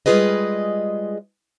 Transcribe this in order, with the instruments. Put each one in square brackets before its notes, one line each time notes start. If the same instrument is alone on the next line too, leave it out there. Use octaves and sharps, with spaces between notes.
[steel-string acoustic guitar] G3 G#3 F4 G#4 B4 D#5